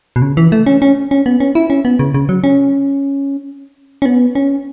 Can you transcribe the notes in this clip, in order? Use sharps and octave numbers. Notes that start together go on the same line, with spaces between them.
B2
C#3
E3
A3
C#4
C#4
C#4
B3
C#4
E4
C#4
B3
C#3
C#3
F#3
C#4
C#4
B3
C#4